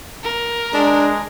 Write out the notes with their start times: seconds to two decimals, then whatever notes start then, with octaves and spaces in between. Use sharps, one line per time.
0.24 A#4
0.74 G#3 D4